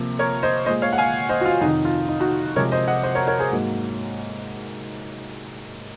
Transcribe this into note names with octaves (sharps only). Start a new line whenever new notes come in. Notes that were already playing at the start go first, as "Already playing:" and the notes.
Already playing: C3 F3 A#3
A#4 C#5
C5 D#5
A#2 G#3 C5 D#5
C#5 F5
F#5
F5 G#5
C5 D#5
F#4
F4
F2 C3 D#3 D#4
F4
D#4
D#4 F#4
C3 F3 G#3 A#4 C#5
C5 D#5
D#5 F#5
C5 D#5
A#4 C#5
A#4 C#5
G#4 C5
G#2 F#3 A#3